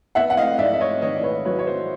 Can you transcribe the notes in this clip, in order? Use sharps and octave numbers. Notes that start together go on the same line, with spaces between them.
B3 E5 F#5
F#5
D#5 F5
G#2 D5 E5
E5
C#5 D#5
D#3 C#5 D#5
D5
B4 C#5
F#3 B4 C#5
C#5
C5